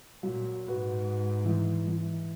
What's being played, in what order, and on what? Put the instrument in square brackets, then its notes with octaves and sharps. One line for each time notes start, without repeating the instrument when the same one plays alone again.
[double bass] A#2 [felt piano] F#3
[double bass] G#2 [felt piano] F#4 B4
[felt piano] E3
E3